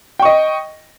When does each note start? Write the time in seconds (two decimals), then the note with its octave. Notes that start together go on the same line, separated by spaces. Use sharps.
0.19 G5
0.22 C#6
0.25 D#5